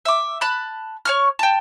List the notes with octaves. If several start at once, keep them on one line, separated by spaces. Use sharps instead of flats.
E5 D6
A5 B5 F#6
C#5 C#6 F6
G5 A5